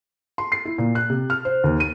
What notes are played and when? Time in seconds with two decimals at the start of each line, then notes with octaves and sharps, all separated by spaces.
0.38 C6
0.52 C7
0.65 E4
0.78 A#2
0.95 F#6
1.10 C3
1.30 F6
1.45 C5
1.64 D#2
1.80 D#7